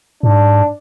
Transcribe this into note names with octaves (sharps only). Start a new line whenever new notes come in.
G#2 D4